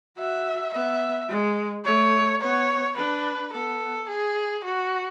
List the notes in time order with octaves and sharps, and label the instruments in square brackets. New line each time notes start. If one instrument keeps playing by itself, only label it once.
[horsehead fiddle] F#4 [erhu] E5
[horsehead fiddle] B3 [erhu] E5
[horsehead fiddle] G#3
[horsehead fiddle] A3 [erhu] C#5
[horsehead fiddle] B3 [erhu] C#5
[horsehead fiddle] D4 [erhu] B4
[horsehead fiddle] B3 [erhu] A4
[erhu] G#4
F#4